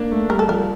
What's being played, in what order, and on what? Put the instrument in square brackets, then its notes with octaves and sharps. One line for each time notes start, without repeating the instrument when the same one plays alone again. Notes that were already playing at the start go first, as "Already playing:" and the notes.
Already playing: [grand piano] A#3 D4
A3
[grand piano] G3 [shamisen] A#4
[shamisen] A4
[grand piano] F3 [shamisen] A#4